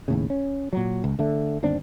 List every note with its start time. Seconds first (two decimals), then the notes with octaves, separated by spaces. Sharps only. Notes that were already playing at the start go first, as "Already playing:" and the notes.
0.08 D#2 A2 C#3
0.30 C#4
0.73 A#2 F#3
1.04 C#2
1.19 D3 A3
1.63 G1 D#2 C4 D4